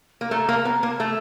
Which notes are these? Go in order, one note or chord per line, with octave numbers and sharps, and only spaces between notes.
A#3
A3 A#5
A#3 A5
B3 A#5
A#3 A5
A3 A5